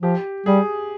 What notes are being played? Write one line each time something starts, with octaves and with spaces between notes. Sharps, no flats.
F3 G4
G3 G#4